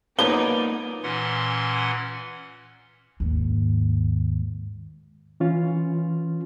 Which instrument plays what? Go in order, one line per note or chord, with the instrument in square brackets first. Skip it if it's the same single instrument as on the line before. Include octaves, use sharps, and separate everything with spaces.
[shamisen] F3 F#3 B3 [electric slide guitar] A#3 B4 [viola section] D#4 D5 [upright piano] G7
[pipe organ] A#2 E3 C#4 F#5 C6
[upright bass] D#2 G#2
[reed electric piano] E3 C#4 F4